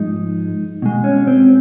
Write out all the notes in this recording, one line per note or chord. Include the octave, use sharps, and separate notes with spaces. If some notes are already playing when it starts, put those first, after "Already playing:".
Already playing: G#2 F3 G#3 D#4
B2 G#3
C#4
C4